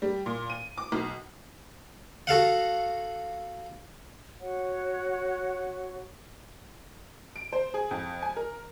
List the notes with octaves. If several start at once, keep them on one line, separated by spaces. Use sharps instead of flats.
G3
A#2
D#7
D6
B1
F#4 A4 F5 F#5
F#4 C#5 F#5
D7
C5
G#4
F2
G#5
A#4